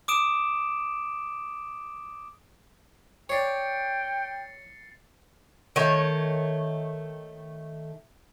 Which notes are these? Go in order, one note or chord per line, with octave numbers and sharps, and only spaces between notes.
D6 D#6 D7 E7
C#5 D5 G5 A6 C7 C#7
D#3 A3 C#5